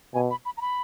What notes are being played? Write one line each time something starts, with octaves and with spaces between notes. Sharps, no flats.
B2 G#5
B5
B5
A#5
B5